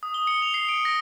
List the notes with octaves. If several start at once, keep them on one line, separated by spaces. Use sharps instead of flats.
D#6
G7
C#7
F7
C7
D7
A#6